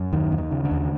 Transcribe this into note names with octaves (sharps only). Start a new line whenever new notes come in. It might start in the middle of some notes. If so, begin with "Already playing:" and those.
Already playing: F#2
D#2 D#3
D#2
D#3
C#3
D3
D#2